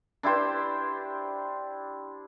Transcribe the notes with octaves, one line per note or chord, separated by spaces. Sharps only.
D4 E4 G4 C5